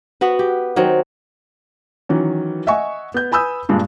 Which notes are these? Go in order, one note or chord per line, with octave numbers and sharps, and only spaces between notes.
B3 F#4 B4
G4
D#3 F#3 C4
D#3 E3 F#3 C#4
D#5 E5 F#5 G#5 C#6
B3 G6
B4 G#5 B5 D#6 E6 G6
G2 A#2 G#3 D4